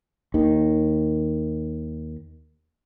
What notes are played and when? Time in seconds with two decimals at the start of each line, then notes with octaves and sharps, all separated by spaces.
0.34 D#2 D#3